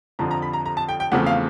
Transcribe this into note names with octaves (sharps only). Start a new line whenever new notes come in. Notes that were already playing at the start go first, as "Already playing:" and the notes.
F2 D3 F3 A#5
A#5
B5
A#5
A#5
A5
G5
G5
E2 C#3 F3 A3 C4 F#5
F5